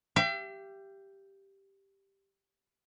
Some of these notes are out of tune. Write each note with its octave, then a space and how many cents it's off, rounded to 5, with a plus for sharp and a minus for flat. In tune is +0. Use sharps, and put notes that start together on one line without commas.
G4 +0 E5 +45